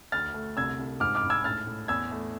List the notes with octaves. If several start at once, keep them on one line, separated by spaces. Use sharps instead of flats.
D2 F6 A6
A3
C2 E6 G#6
C2
G#2 D6 F6
D6 F6
G#2
E6 G#6
A2 F6 A6
A2
E2 E6 G#6
A3